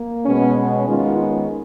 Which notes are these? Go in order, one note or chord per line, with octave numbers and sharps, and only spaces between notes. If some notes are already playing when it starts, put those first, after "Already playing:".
Already playing: A#3
B2 G#3 B3 C#4
C#4
D#3 G#3 B3 C#4 F4
C#4